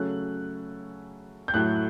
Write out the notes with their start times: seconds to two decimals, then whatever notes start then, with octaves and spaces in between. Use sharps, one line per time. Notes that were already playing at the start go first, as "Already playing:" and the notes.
Already playing: C#3 F#3 A3 C#4 F#6
1.48 G6
1.54 A2 F#3 A3 E4 F#6